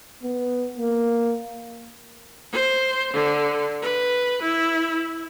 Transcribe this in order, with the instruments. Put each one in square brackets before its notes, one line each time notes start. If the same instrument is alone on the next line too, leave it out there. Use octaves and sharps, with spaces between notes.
[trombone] B3
A#3
[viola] C5
D3
B4
E4